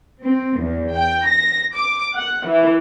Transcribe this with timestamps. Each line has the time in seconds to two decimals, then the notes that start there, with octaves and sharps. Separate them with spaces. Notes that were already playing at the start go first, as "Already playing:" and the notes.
0.24 C4
0.60 E2
0.95 G5
1.27 A#6
1.74 D6
2.16 F#5
2.47 E3